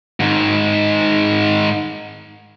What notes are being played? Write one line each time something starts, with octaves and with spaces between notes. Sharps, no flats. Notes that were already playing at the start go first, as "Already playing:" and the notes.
G#2 D#3